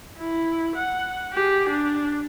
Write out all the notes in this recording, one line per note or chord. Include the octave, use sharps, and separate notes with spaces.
E4
F#5
G4 G#4
D4